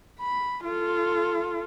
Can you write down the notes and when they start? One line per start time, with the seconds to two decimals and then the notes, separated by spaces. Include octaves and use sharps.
0.20 B5
0.64 F4 A4